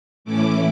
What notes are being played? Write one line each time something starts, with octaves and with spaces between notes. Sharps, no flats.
A2 E3 A3 C#4 E4 D6